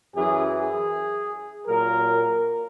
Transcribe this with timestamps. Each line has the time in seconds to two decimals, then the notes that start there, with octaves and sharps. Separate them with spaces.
0.14 F#2 E3 G#4
0.52 G#4
1.67 A#2 F#3 A#4